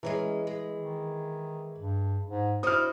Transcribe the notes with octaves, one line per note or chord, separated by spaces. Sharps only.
E3 G#3 C#4 A#4
G#3
D#3
G2
G#2
D4 E4 F#4 C5 D#6 F6